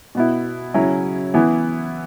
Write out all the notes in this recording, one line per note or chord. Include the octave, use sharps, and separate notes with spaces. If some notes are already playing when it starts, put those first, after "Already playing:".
B2 B3 E4
C#3 F#3 C#4 E4
E3 B3 E4